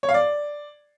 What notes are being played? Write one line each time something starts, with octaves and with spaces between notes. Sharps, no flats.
C#5
F5
D5